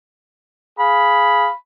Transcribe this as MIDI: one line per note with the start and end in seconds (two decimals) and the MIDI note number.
0.79 1.49 68
0.79 1.49 77
0.79 1.54 83